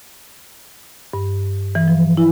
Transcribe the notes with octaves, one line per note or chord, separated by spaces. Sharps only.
G2
E3
F3
E4